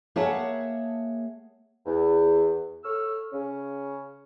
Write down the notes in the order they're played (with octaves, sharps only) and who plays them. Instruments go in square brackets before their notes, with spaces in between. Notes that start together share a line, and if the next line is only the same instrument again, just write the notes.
[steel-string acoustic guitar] A#3 G#4 C#5 E5 F#5 A5
[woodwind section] E2
A4 C#5 E6 F6
C#3 C#4